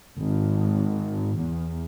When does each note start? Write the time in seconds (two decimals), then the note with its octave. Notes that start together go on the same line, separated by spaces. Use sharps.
0.17 G#1
1.36 E2